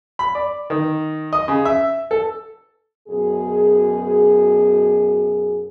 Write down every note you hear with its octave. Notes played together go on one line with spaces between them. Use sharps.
B5
D5
D#3
D#5
C#3
E5
A4
F#2 B2 G#4